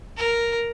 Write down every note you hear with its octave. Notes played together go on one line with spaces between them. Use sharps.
A#4